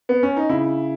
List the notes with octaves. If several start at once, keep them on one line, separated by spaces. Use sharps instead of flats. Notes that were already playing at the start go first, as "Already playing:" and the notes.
B3
C#4
D#4
C#3 E4